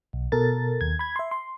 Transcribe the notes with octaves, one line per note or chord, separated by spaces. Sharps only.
B1
B2 A4 A#4 A6
D#2 G#6
B5 G#6
E5 C6
C6